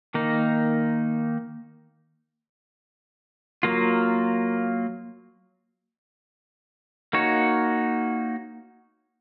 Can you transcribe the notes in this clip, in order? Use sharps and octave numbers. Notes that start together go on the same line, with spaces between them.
D#3 A#3 D#4
F#3 A#3 F4
A#3 D#4 F#4 C#5